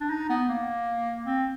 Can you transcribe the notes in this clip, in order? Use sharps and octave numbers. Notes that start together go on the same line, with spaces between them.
D4
D#4
B3
A#3
C4